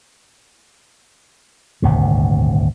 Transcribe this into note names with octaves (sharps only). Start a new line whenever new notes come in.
D#1 G#1 D2 C3